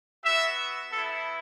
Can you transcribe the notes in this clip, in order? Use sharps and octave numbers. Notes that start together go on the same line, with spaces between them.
B3 F#4 E5
B3 E4 A4